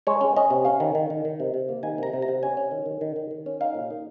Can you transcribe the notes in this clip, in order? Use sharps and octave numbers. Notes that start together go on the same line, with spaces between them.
G#3 C#5
C#4
C#4 D#5
C3
C#4 F5
D#3
D#3
D#3
D#3
C3
C3
A#3
D#3 G#5
C3 A#5
C3
A#5
C3
C#4 G#5
C#4
D#3
D#3
D#3
D#3
D#3
C#4
D#4 F5
A#2
D#4